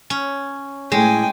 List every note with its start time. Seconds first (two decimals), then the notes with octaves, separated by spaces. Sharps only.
0.10 C#4
0.92 A2 G#3 G#4 G5 G#5